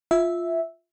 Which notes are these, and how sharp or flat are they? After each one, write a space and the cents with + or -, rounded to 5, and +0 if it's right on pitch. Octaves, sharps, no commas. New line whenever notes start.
F4 +0 E5 -5